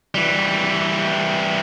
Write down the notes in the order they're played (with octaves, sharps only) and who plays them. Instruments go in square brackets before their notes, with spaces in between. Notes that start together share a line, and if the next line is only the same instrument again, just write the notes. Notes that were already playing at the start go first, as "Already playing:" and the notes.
[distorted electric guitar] E3 G3